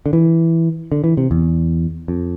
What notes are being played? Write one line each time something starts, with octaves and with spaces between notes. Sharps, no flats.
D3
E3
D3
E3
C3
E2
F2